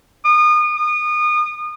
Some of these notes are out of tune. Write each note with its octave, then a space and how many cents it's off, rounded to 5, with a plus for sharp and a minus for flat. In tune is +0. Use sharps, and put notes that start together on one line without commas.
D#6 -35
D#6 -30